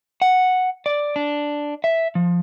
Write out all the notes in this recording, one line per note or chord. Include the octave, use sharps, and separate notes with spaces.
F#5
D5
D4
E5
F3